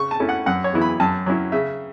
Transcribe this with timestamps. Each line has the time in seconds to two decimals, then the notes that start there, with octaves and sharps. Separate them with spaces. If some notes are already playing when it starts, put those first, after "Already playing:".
Already playing: C#3 C#6
0.11 A5
0.20 A3 C#4 E4
0.29 F#5
0.46 F#2 F#5
0.64 C#5
0.72 C#3 E3 B3 E4
0.81 B5
1.00 F#2 A5
1.26 F#3 C#4 E4
1.52 C#3 E5